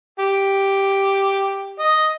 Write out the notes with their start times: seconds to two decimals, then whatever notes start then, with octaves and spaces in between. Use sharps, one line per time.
0.19 G4
1.79 D#5